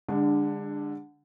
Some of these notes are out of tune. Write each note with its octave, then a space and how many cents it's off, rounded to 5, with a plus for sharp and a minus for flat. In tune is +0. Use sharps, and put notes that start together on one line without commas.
D3 +0 G#3 -35 D4 +10